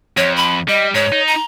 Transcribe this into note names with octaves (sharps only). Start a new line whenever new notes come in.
F2 C#5
B5
G3 D#5
G#2 C#5
D#4
A#5